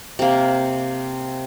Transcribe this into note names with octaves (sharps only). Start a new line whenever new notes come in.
C3 A#3